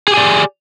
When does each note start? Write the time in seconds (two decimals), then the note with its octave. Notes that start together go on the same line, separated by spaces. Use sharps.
0.08 G#4
0.11 G4
0.14 G#5
0.17 D5